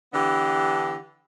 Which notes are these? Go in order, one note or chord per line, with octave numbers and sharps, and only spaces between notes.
D3 E3 B3 D4 G4